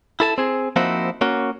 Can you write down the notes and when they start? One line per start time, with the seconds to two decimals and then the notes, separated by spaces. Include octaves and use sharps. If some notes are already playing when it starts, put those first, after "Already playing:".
0.20 E4 A4 A5
0.38 C4 G#4
0.76 F3 A#3 C4 D#4 E4 F#4
1.21 A#3 C#4 F#4